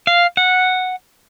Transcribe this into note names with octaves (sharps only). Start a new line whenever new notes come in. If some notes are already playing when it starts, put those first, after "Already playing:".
F5
F#5